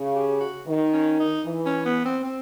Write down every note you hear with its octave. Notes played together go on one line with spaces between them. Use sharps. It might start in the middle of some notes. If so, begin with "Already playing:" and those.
Already playing: C#3
G4
F#4
D#3
C#4
D#4
E3
C#4
B3
C4
C4